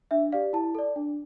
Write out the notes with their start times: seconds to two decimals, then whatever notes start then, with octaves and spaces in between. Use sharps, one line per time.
0.11 D4 E5
0.32 G4 D5 F5
0.53 E4 A5
0.75 A4 D5
0.96 D4